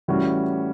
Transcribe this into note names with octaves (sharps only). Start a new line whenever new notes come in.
A2 E3 G3 C#4 F#4